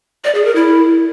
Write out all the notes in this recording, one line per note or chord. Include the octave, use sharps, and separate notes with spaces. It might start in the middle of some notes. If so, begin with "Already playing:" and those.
D5
G#4
A#4
E4